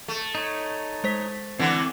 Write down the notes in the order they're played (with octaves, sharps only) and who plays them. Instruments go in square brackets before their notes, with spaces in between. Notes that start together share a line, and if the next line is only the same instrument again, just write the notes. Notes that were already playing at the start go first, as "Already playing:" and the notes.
[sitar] A3
[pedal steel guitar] D#4 C#5
[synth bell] G#3 C5 B6
[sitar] D3 E3 [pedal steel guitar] C4 D6